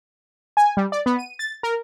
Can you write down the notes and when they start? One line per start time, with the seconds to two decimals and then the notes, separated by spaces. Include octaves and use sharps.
0.57 G#5
0.77 G3
0.92 D5
1.06 B3
1.19 D#7
1.39 A6
1.63 A#4